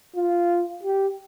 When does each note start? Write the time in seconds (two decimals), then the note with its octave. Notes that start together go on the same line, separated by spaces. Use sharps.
0.16 F4
0.83 G4